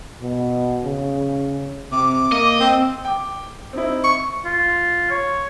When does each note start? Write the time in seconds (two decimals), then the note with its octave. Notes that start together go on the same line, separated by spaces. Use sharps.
0.21 B2
0.85 C#3
1.92 C3 D6
2.32 A#3 D#5
2.60 C4 E6
3.05 G5 D6
3.73 C4 D#4 E4
4.04 C#6
4.45 F4
5.10 C#5